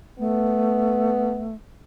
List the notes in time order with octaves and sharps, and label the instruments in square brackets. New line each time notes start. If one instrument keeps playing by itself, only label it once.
[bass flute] A3 [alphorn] B3